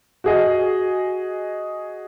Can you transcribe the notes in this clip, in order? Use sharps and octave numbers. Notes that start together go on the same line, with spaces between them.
F#4 G#4 D#5